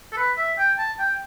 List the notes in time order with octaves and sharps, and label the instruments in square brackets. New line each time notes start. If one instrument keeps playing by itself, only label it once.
[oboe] A4
B4
E5
G5
A5
G5